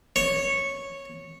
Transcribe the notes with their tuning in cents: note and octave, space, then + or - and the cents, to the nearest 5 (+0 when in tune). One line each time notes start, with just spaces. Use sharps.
C#5 -10